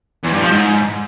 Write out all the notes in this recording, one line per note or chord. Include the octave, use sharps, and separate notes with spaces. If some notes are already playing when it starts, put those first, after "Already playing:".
E2
G2
F3
G#2